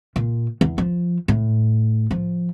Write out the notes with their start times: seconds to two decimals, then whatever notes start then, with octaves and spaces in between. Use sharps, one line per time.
0.16 A#2
0.61 E2
0.78 F3
1.28 A2
2.11 F3